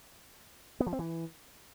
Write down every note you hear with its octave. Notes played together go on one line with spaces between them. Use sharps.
B3
F3
C4
E3